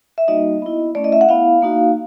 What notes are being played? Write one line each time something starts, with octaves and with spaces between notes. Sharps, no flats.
E5
G3 A#3 D#4 F#4 D#5
B3 E4
A3 C#4 E4 D5
D#5
E5
F#5
B3 E4 F5
A#3 D#4 F#4